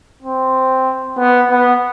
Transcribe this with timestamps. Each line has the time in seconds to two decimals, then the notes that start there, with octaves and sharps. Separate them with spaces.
0.23 C4
1.18 B3
1.51 B3